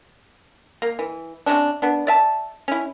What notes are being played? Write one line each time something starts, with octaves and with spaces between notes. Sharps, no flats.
A#3
E3
C3 D#3 C#4 D4
B3 D4
D5 E5 A5
C#4 E4